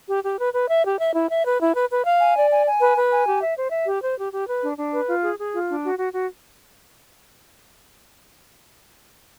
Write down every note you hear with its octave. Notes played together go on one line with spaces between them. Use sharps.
G4
G4
B4
B4
E5
G4
E5
E4
E5
B4
E4
B4
B4
F5
G#5
D5
G#5
G#5
B4
B4
G#5
G4
E5
C5
E5
G4
C5
G4
G4
B4
D4
D4
B4
F4
G#4
G#4
F4
D4
F#4
F#4
F#4